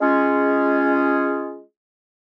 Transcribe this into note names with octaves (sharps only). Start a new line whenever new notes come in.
G#3 C#4 F4 G#4